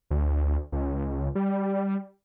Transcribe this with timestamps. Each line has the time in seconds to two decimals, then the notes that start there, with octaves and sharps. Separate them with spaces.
0.10 D2
0.72 C#2
1.35 G3